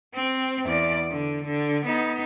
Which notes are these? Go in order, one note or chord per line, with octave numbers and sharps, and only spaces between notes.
C4
E2 D5
D3
D3
B3 D#4